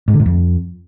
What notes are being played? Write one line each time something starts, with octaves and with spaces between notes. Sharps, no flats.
G#2
D3
G#2
F2